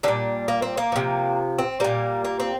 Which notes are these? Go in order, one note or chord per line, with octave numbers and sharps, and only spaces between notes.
A#2 D3 G3 D4
A#3
C4
A#3
C3 F3
C4
A#2 G3 A#3
A#3
C4